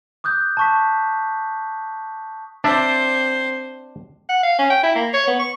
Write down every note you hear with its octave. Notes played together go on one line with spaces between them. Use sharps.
D6 D#6 F#6 G6
A5 C#6 B6
C4 D4 C5 D5 E5
F#5
F5
C#4
G5
E4
A#3
C#5
B3
C#6